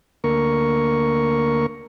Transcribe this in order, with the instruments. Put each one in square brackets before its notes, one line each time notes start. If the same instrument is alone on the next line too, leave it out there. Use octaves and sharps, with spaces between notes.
[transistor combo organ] D2 A#3 A#4 C#6